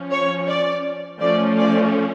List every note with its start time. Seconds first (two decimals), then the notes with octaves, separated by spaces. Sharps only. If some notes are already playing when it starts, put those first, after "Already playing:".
Already playing: F3 C#4
0.11 C#5
0.47 D5
1.21 F3 A3 C#4 D5
1.58 D5